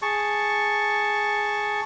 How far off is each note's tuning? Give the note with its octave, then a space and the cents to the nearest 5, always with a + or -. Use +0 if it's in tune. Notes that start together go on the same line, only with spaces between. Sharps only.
G#4 +0 A5 +0 C#6 +0